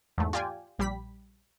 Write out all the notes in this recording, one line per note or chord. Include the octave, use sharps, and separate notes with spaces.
E2 G#2 A3
F4 G4 D5 G5 G#5
A#1 G3 G4 B5 B6